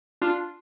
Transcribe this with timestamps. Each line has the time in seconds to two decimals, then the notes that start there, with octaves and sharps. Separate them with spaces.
0.22 D4 F4